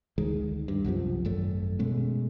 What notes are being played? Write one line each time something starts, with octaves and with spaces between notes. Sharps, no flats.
D2 D#3 G#3
G2
C2 F#2 C3 F3
G#1 F#2 A3
B2 G#3 A3 C#4